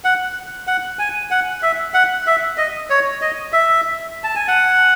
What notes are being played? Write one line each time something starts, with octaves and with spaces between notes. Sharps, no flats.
F#5
F#5
G#5
F#5
E5
F#5
E5
D#5
C#5
D#5
E5
A5
G#5
F#5